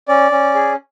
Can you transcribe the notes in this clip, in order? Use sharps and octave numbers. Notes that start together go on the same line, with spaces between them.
C#4 D5
C#4
G#4